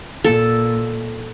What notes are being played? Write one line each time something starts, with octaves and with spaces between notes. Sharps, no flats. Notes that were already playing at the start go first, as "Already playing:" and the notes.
A#2 A4